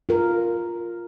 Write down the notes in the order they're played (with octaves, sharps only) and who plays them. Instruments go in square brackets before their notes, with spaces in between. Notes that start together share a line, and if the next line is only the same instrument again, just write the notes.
[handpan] F4 A#4